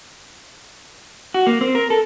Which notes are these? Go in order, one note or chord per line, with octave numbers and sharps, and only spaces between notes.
F#4
A#3
C4
A#4
A4